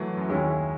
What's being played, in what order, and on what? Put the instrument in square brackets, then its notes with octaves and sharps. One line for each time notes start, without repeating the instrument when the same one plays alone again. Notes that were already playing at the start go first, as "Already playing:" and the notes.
Already playing: [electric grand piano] E3 F#3 A3
F#2
[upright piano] D#2 D#3 G#3 C#4 E4